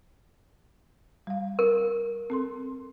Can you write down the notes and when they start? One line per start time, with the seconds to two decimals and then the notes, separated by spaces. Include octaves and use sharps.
1.27 G3 F5
1.59 A#4
2.30 C4 A4 C6